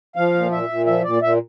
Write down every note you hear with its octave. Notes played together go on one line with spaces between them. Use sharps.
F3 F5
A#2
A#2 E5
A#2
F3 E5
A#2 D5
A#2 E5